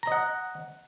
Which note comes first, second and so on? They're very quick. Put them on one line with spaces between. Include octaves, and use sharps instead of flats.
A#5 D#5 F#5